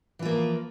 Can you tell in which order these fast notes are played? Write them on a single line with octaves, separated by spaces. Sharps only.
E3 F4 A#3 F3